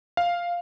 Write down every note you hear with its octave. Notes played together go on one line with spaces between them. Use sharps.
F5